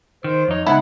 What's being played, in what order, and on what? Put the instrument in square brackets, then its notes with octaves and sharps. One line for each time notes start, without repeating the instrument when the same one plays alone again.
[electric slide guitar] D#3 [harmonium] C5
[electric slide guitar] F2 D#4 [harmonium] C#5
[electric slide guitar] C#3 G#3 B3 [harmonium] D#4 F#5 [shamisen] E4